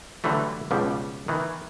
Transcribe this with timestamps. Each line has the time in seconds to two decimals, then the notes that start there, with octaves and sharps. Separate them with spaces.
0.24 D3 E3 F#3 G3 A3
0.71 C#2 B2 F3 G3
1.28 D#3 E3